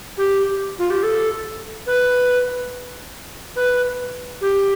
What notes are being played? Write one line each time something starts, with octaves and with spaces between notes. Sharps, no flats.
G4
F4
G4
A4
B4
B4
G4